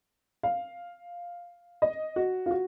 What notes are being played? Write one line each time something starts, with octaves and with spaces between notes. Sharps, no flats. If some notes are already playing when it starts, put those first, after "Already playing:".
F5
D#5
F#4
F4
F#4